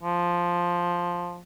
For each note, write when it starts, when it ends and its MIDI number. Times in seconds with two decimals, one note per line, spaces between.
0.03 1.41 53